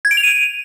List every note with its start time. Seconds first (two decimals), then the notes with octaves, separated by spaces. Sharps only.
0.05 G#6
0.11 D7
0.17 F7
0.23 D#7